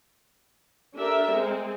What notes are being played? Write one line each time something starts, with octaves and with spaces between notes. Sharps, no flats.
D4 G4 A4 A#4 E5
G#3 C4